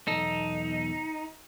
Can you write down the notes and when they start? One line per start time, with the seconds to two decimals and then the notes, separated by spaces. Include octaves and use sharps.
0.08 B1 E2 D#4 A4